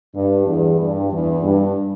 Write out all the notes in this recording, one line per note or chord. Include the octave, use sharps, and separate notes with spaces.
G2
E2
G2
E2
G2